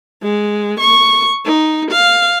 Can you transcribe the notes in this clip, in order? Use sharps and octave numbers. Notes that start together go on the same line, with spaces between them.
G#3
C#6
D#4
F5